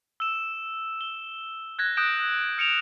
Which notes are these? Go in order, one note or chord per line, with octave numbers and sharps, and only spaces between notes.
E6 E7
G7
F#6 G#6 A#6
D#6 F#6 G6 A#6 D7 E7
F6 C#7 D7 E7 F7